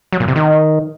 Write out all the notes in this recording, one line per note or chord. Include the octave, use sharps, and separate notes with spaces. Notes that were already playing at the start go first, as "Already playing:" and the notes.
F#3
A#2
C3
D#3